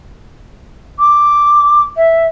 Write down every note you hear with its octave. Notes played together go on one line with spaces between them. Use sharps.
D6
E5